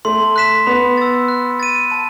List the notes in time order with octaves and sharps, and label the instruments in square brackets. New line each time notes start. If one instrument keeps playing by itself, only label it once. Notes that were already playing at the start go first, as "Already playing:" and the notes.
[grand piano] A3 [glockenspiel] C6
[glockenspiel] F#6 B6 E7
[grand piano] B3 [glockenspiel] B5
[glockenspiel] E6 A6
F#6
A6 D#7
A5